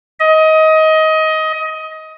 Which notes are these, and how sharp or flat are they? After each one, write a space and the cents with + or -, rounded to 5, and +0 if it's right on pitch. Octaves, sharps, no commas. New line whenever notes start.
D#5 +20